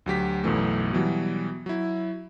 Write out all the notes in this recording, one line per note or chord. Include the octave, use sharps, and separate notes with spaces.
D2 F#3 G4 B6
B1 F#2 B2 E3 A3
B2 E3 F#3 G3
F#3 E4